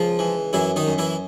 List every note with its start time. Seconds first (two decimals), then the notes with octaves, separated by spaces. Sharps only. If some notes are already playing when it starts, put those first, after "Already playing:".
Already playing: C#2 F3 F4
0.19 E3
0.53 F#2 E3 E4
0.76 D#3 D#4
0.87 F#2
0.98 E3 E4